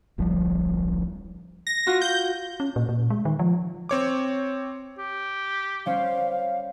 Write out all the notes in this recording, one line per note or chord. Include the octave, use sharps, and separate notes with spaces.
D1 A#1 F3 G3
A#6
F4 F#4
G6
C#4
A#2
A#2
G#3
D#3
F3
C4 C#5 D6
G4
G3 C#4 C5 F5